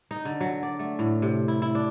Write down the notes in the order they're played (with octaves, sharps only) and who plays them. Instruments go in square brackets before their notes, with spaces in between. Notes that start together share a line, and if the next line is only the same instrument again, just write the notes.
[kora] D#4
D3
F#3
D5
A3
A2
C3
E4
E4
D4